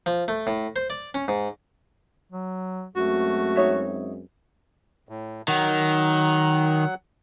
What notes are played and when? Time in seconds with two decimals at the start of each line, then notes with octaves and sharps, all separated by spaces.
0.06 F3
0.28 A3
0.47 A2
0.76 C5
0.90 D5
1.15 C#4
1.28 G#2
2.32 F#3
2.96 F#2 G#3 A3 C4 F#4
3.56 D#4 C#5 E5
5.09 A2
5.48 D#3 F#3 F#5